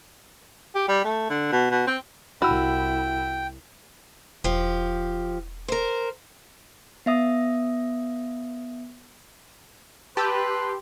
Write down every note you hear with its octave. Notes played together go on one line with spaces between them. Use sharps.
G4
G3
A3
D3
B2
B2
C4
C2 E4 F#4 G5 B5 E6
E1 F3 G4
A#4 C5
B3 E5 D#6
G4 B4 A5 C6 E6 G6